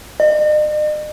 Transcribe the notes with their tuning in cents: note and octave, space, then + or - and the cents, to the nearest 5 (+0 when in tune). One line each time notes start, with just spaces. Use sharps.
D#5 -45